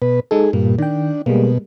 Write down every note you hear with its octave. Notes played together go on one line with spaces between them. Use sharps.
B2 B4
G#3 D#4 G#4 A4
G2 A#2 A#3
D#3 D4 G5
B2 G3 G#3 A#3